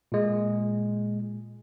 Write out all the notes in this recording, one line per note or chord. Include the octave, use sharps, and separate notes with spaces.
A#2 G#3